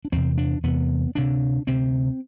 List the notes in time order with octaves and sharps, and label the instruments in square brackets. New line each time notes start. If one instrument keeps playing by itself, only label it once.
[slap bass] D4
E2 C3 C4
D4
E2 C3 B3
D2 C3 D4
D2 C3 C4